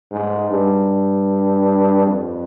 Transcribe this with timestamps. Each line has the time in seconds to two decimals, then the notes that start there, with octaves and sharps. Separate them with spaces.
0.11 G#2
0.50 G2
2.06 F2